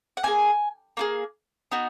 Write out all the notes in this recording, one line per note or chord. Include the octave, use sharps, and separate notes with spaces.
F#5
A#3 F4 G#4 G#5
A#3 F4 G#4
B3 D#4 F#4